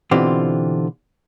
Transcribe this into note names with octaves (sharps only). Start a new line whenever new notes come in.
B2 D3 E3 C4 F4 G4